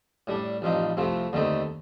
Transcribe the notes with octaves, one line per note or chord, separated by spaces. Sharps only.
A2 G3 D4
A1 G2 F3 C4 D#4
C2 C3 F3 A3 C4
D#2 D3 A3 C4 D#4